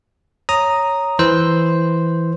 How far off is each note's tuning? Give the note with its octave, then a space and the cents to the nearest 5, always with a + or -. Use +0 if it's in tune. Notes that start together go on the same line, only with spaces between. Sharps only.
C#5 +0 A#5 +0 D#6 +0
E3 +0 C5 +0